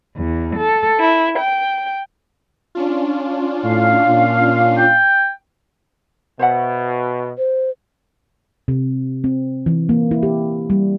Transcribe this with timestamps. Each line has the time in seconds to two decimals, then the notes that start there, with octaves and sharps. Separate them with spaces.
0.17 E2
0.56 A4
1.00 E4
1.38 G5
2.75 C#4 D4 F4
3.64 A2 F5
4.07 A#2
4.78 G5
6.39 B2 C5 E5 F#5
7.38 C5
8.68 C3
9.24 C4
9.66 E3
9.89 A#3
10.11 E4
10.23 G4
10.70 G3